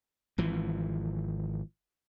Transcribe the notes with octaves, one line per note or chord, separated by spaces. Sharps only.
G#1 E3 F3